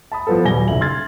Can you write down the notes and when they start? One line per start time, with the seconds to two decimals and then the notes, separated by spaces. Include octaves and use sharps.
0.12 A5 B5 D#6
0.27 F3 G3 B3 F4 A4
0.45 D#1 F#3 G3 G#5 A#6 G7
0.68 F#1 B1 E5 F#7
0.81 C6 F6 G#6 A6